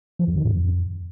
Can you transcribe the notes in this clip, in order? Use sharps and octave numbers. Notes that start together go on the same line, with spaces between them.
F3
E2
D#3
A2
F2